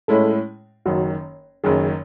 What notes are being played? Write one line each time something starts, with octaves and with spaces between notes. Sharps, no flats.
A2 G#3 C#4 E4 A4
F#1 F#2 D#3 F#4
F#1 F#2 D#3 G#4